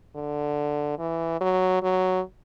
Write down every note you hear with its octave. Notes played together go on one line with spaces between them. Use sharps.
D3
E3
F#3
F#3